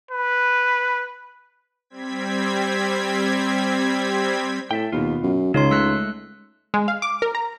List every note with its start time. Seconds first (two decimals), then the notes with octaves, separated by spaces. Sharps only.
0.11 B4
1.90 G3 C4 G#6 B6
4.71 A2 A4 E5 G5
4.92 D#2 B2 B3 F4
5.23 F#2
5.54 C#2 C#3 D#4 C#5 C6
5.71 G#3 A3 E6 F#6
6.74 G#3
6.88 F5
7.02 D6
7.22 A#4
7.35 A#5